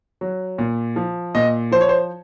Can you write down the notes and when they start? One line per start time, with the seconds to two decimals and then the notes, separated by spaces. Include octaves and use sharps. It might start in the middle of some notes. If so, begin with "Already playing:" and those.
0.21 F#3
0.58 A#2
0.96 F3
1.35 A#2 D#5
1.71 F3 C5
1.81 C#5
1.89 C5